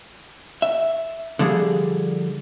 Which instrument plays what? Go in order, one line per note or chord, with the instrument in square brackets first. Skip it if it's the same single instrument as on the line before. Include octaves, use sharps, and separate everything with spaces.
[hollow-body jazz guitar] E5
D3 F3 G3 G#4